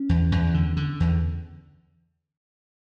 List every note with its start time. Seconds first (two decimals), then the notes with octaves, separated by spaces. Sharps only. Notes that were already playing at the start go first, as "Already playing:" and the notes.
Already playing: C#4
0.09 E2
0.32 E2
0.54 D3
0.77 D3
1.00 E2